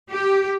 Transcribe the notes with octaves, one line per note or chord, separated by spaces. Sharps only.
G4